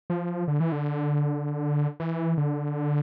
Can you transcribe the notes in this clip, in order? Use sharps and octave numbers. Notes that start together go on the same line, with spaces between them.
F3
D3
E3
D3
E3
D3